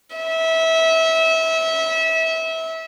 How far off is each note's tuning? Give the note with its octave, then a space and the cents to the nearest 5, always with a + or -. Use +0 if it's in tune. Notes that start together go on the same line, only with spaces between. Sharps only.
E5 -25